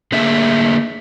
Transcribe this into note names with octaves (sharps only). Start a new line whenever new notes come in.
D3 A3 A#3 G#4 E5